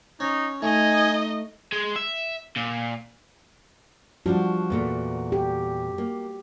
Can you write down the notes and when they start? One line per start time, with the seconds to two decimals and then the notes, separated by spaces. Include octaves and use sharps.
0.20 C#4 D#4
0.62 A3 D#4 D#5 G#5
1.73 G#3
1.96 E5
2.56 A#2
4.26 F3 G3 D4 F#4
4.70 E2 A#2 A3
5.32 G4
5.98 A#3